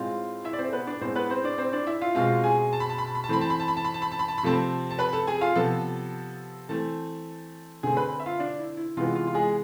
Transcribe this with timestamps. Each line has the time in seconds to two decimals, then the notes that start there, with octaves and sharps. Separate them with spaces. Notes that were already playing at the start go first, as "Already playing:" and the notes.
Already playing: A2 G#3 C4 F4 F5
0.44 E4 E5
0.53 D5
0.59 C4 C5
0.68 A4
0.73 B3 B4
0.87 D4 D5
1.01 A2 G#3 B3 C4 C5
1.15 B3 B4
1.30 C4 C5
1.44 D4 D5
1.58 C4 C5
1.73 D4 D5
1.86 E4 E5
2.01 F4 F5
2.15 B2 G#3 C4 F4 F5
2.44 G#4 G#5
2.73 A5
2.80 B5
2.90 A5
2.98 B5
3.06 A5
3.15 B5
3.24 A5
3.29 E3 A3 C4 B5
3.41 A5
3.50 B5
3.60 A5
3.68 B5
3.77 A5
3.85 B5
3.94 A5
4.02 B5
4.12 A5
4.19 B5
4.28 A5
4.38 B5
4.43 C3 F3 A3 C4 A4 A5
4.91 A5
4.99 B4 B5
5.13 A4 A5
5.27 G#4 G#5
5.41 F4 F5
5.55 C3 F3 B3 A4 A5
6.69 E3 A3 C4 A4 A5
7.83 D3 A3 C4 G#4 G#5
7.97 B4 B5
8.19 E5
8.26 F4 F5
8.39 D4 D5
8.59 E4
8.77 E4
8.97 C3 E3 G#3 B3 F4
9.15 F4
9.27 F4
9.34 G#3 G#4